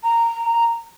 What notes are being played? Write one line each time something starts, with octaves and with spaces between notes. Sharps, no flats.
A#5